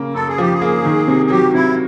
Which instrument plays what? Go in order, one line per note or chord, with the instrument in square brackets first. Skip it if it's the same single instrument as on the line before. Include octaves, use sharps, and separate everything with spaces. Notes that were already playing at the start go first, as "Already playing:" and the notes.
Already playing: [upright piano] C#3 A#3
[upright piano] F#2 [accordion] A4
[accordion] G#4
[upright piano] F3 [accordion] G4
[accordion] G#4
[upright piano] A#3
D#3
C3
[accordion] G#4
[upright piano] F#3 [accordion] G4
[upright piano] C3 [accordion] E4